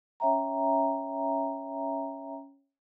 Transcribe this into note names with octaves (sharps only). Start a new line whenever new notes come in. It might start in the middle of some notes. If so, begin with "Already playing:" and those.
C#4 C#5 E5 G5 A#5